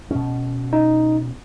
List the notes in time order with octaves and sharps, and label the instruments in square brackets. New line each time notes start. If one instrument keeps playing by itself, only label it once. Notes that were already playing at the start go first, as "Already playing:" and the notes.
[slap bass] B2 C#4
[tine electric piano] D#4